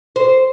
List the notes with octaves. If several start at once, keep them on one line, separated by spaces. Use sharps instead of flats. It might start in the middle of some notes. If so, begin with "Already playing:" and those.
C5